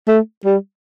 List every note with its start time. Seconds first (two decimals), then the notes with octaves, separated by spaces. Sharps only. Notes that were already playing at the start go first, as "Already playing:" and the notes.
0.08 A3
0.45 G3